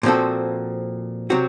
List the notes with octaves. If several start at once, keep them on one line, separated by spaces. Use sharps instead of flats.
A#2 F3 C4 F#4 A4
C3 F#3 C4 F#4